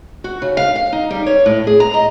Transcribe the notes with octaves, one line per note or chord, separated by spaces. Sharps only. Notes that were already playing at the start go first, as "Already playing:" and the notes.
F#4
C#3
F5
F5
D#4
G3
C#5
A2
G#4
A#5
D#5